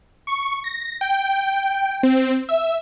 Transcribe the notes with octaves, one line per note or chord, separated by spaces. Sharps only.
C#6
A#6
G5
C4
E5